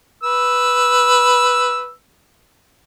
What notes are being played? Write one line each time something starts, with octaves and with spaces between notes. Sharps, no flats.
B4 E6